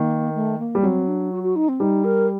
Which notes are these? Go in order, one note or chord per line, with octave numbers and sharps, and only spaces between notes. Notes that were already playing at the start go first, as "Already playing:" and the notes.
Already playing: D#3 A#3
A3
A#3
G3
F#3 C4
D4
F#4
F#4
D#4
C4
G3 D#4
A#4